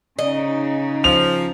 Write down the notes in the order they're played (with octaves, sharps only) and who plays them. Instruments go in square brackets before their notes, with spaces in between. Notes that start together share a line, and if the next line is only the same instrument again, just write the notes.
[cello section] C#3 D#4 [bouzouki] D#5
[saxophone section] F3 [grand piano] F7